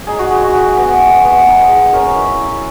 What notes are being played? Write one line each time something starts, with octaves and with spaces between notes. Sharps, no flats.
D#4 G#4
F#4
G#3
F#4
G#3
B3
G#3
B3
D#4
G#3
C#4 A#4
E4
E4